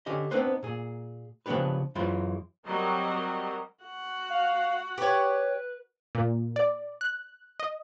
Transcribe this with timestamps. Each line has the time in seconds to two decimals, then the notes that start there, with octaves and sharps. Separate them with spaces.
0.06 D3 C#4 G4 D#5
0.31 B3 C4 D4 D#4 B4 C5
0.63 A#2 G#4
1.46 C#3 F3 B3 D4 G4 B4
1.95 F#2 E3 G#3 F4 C5 B5
2.65 F#3 G3 C4 A#4 D#5
3.84 F#4 F#5
4.30 F5
4.98 G4 B4 C#5
6.15 A#2
6.56 D5
7.01 F#6
7.60 D#5